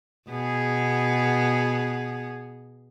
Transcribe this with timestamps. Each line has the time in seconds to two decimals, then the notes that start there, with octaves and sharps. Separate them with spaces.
0.28 B2 B3 G#4